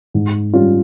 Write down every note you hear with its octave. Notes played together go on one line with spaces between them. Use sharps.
G#2
G3 C#4 F4